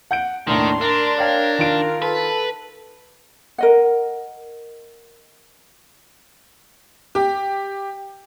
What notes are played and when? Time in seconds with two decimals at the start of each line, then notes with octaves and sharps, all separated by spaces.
0.11 F#5 G6 D7
0.47 D#2 A2 D#3 D4 C6
0.81 D4 A#4 D5
1.18 A#4 C#5 F5 G5
1.59 D#3 F4 F5 D7
2.02 A4 B4
3.58 A#4 D#5 F#5
7.15 G4